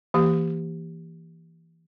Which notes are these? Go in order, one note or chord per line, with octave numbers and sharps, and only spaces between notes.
E3 A#3 G4